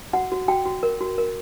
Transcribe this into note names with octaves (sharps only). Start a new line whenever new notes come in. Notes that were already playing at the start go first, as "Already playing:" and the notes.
F#4 F#5
F#4
F#4 G5
F#4
A#4
F#4
A#4